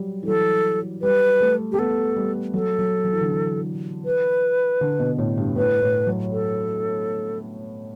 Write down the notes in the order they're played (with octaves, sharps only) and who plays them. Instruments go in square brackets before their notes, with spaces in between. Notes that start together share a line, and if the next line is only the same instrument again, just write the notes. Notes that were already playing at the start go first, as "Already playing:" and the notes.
Already playing: [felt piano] F#3 G3
E3
[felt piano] F#3 [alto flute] A4
[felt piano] G3 [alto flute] B4
[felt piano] A3
[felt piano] A3 [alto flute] G4
[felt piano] B3 [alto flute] A4
[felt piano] G3
[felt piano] F#3 [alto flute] A4
[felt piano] F#3
F#3
E3
D3
E3
[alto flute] B4
[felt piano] D3
B2
A2
G2
[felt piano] A2 [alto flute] B4
[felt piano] A2
F#3
[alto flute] A4